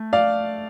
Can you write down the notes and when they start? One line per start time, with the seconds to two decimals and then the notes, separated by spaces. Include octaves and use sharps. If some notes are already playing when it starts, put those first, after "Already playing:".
Already playing: A3
0.13 D5 F5